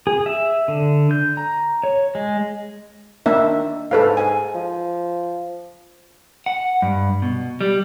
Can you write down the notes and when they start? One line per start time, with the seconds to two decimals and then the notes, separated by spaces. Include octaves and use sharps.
0.07 G#4
0.26 E5
0.68 D3
1.11 G6
1.37 A#5
1.84 C#5
2.15 G#3
3.26 D#3 A#3 D4 E5
3.91 G#2 A4 B4 F5
4.17 G#5
4.55 F3
6.46 F#5
6.82 G2
7.22 B2
7.61 G3